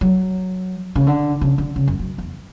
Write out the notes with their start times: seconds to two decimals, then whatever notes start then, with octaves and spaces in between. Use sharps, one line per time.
0.01 F#3
0.96 C#3
1.07 D3
1.41 C#3
1.58 D3
1.76 C#3
1.87 F#2
1.99 F#2
2.18 E2